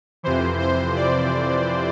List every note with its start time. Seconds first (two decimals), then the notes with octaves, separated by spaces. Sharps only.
0.23 F2 C3 E3 C5
0.60 C5
0.96 D5